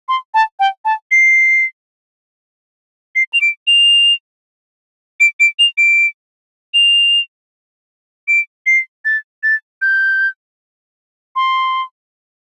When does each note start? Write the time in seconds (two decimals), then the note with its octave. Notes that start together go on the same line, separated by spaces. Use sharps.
0.09 C6
0.34 A5
0.60 G5
0.85 A5
1.11 C7
3.16 C7
3.33 F7
3.41 D7
3.67 F7
5.20 D7
5.40 D7
5.59 F7
5.78 D7
6.74 F7
8.28 D7
8.66 C7
9.05 A6
9.43 A6
9.82 G6
11.36 C6